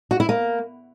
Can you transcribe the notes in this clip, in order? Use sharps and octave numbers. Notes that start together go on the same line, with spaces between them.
F#4
E4
A#3